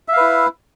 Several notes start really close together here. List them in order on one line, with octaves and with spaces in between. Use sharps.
E5 F5 B4 E4